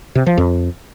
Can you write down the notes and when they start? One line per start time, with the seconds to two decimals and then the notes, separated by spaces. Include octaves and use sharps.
0.15 C3
0.26 F3
0.38 F2